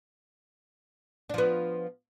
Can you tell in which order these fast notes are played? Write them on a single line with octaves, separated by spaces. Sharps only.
D4 F3 B3